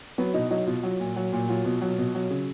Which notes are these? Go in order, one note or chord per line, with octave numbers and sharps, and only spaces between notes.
F#3 B3
B2 D#4
F#3 D#4
B2 F4
F#3
A#2
F#3
A#2
F#3 F4
B2
F#3
B2
F#3
C#3